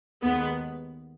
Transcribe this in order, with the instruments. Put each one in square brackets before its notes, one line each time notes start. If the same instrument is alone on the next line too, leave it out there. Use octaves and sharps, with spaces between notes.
[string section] D#2 D#3 G#3 B3